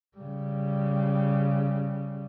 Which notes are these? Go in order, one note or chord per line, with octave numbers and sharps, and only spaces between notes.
C#3 G3